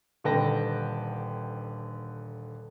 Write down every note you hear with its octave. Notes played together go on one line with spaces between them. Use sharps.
D#1 D3 B4 G5 A5 A#6